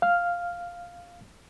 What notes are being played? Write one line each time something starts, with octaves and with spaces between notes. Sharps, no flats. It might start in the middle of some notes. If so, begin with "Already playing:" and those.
F5 F6